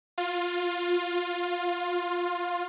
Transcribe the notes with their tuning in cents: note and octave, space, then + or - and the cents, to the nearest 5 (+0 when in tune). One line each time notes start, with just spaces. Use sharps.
F4 +15